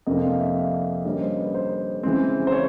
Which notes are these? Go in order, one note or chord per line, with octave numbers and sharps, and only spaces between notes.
F2 C3 F3 A#3 D4 D#5
F5
E5
F5
D3 G3 A#3 C#4 D#5
C5
B4
C5
C#3 E3 G#3 C4
C5
C#5